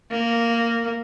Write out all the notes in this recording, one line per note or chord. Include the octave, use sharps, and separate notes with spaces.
A#3